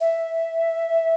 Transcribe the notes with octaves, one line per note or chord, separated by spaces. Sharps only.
E5